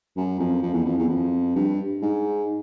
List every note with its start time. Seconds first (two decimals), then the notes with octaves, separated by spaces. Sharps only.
0.16 F#2
0.39 F2
0.62 F2
0.74 E2
0.86 F2
0.98 E2
1.09 F2
1.56 G2
2.02 G#2